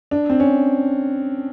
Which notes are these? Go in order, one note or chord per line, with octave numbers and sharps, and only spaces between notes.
D4
C4
C#4